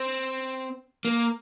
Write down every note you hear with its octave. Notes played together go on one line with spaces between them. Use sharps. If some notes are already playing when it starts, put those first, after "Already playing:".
Already playing: C4
A#3